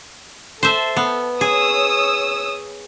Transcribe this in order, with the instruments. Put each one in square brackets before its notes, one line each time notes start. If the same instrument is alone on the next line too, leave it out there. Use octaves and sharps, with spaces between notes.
[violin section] A4 [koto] C5 E5
[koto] B3
[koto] G#4 [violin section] C#5 D#6 E6